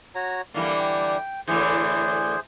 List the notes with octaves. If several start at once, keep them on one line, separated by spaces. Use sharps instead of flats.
F#4 C#5 A#5
D3 E3 G3 A#3
G5
A2 D3 E3 G#4 C5